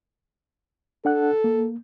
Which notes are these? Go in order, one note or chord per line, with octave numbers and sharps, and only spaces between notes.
D4 A4 F#5 F#6
A#3